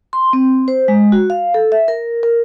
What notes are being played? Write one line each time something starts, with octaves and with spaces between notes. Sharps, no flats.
C6
C4
C5
G#3
F#4
F5
A4
E5
A#4
A#4